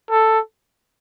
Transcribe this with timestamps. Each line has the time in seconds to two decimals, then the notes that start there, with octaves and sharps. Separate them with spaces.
0.11 A4